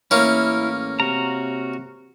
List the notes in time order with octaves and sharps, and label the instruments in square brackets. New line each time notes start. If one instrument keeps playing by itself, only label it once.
[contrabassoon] A1 [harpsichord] A#3 C#4 [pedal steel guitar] E4
[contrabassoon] C3 [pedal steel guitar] F#4 A#5